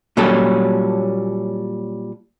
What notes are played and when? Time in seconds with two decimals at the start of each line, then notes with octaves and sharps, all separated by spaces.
0.17 A#2 F#3 G3 C#4 A4